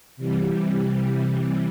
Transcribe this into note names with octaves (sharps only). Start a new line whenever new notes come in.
C3 E3 G3